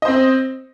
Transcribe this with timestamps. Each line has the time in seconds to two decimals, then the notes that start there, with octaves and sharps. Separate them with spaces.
0.02 D#5
0.05 C5
0.08 C4